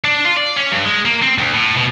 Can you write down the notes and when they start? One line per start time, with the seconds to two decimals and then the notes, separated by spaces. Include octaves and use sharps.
0.04 D4
0.25 F4
0.37 D5
0.57 C#4
0.72 G2
0.85 G#3
1.05 A#3
1.22 C4
1.38 D2
1.54 A2
1.77 B2